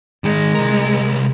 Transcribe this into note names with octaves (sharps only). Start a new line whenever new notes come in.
D#3 G#3 G#4
C2 A#4